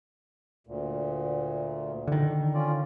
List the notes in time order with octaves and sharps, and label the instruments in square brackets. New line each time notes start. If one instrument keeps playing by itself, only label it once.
[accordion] D2 A#2
[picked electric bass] D3 D#3
[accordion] C#4 F4 D5